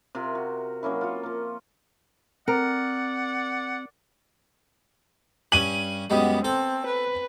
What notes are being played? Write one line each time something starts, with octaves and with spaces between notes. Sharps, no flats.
C3 F4 A#4 C6
F#4
F#3 A#3 C#4 E4
F4 C#5
F3 A#3
C4 A#4 D5 F#5
G2 C#4 G#5 D#7 F#7
F#2 G3 G#3 B3
C4 A4
B4